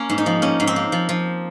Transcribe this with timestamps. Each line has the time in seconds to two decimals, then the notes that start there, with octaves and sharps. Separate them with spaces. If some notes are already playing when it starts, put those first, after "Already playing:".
Already playing: A#3 C#4
0.09 G#2
0.18 D#4
0.26 F3
0.42 A#3 C#4
0.60 G#2
0.67 C4
0.76 A#3
0.92 F3
1.09 F3